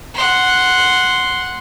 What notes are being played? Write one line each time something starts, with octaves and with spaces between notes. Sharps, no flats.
F#5 C6